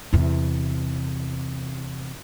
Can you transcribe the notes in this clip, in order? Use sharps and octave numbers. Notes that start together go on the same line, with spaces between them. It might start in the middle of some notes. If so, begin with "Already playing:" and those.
E2 C3